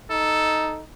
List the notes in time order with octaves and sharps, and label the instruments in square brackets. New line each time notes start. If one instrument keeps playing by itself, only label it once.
[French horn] D#4 [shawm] A4